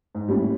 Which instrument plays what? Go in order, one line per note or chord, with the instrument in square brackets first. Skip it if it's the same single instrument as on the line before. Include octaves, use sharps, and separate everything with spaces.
[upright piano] G#2
[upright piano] A2 [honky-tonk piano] G3 A#3 C#4